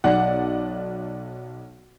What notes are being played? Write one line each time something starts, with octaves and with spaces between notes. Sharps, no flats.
B1 D5 F#5